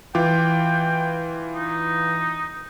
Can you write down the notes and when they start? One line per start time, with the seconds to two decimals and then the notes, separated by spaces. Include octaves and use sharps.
0.15 E3 F4 G5 D6
1.55 D#4